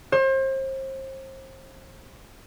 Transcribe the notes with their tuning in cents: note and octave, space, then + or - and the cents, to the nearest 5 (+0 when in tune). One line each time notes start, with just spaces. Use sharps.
C5 +35